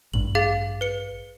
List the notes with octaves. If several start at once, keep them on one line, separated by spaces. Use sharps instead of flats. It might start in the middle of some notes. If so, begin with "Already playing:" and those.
A1 G2 F#7
G#4 F5 A6
B4 C#7